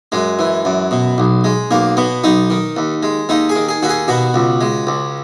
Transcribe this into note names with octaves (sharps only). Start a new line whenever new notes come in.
F#2 G#3
E3
F#2
B2
B1
G#3
B1 A#3
B2 B3
B1 D#4
D#3
D#2
G#3
D#2 D#4
G#4
D#3
G#4
D#2 F#4
G#4
B2 F#4
C#2
G#3
C#2